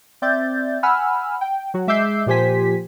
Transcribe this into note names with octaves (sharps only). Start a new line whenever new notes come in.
C4 D5 E5 G6 A6
F#5 G#5 B5 E6 F6
G5
F#3 F#4
G#3 E5 D6 E6 G6 C7
A#2 F3 G4 C5 G#5 B6